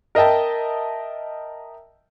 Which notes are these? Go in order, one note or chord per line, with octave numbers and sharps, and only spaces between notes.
A#4 D#5 E5 G5 A5